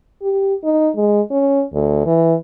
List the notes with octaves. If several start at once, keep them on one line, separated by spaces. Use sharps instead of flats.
G4
D#4
G#3
C#4
D2
E3